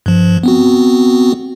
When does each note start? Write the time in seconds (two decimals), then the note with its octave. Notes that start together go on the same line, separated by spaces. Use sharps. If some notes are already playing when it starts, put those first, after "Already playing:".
0.06 G2 F3
0.43 B3 C4 F#4